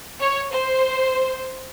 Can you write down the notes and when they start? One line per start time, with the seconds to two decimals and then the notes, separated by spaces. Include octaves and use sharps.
0.20 C#5
0.51 C5